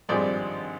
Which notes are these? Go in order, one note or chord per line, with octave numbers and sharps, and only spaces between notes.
G#1 G2 F3 G#3 C4 D5